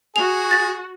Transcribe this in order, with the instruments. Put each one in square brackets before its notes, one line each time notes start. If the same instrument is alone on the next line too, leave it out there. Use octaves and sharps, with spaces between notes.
[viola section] F#4 [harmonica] G#4 [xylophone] F7
[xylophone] A6 A#6